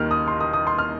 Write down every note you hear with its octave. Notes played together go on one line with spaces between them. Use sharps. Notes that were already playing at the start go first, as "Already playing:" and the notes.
Already playing: D#2 D#3 G3 A#3 F6
D#6
C6
D#6
D#6
C6
F6